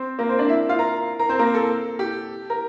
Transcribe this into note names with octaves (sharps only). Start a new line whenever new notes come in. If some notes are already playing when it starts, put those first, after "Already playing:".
Already playing: C4 C5
A#3 A#4
C4 C5
D4 D5
E4 E5
F4 F5
A#4 A#5
A#4 A#5
C4 C5
A#3 A#4
A4
G4
A#4